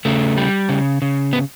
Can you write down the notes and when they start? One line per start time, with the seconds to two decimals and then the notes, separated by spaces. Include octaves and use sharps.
0.05 C#3 A3
0.37 G3
0.69 C#3
1.02 C#3
1.33 B3